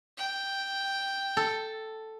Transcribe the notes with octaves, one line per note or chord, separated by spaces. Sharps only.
G5
A4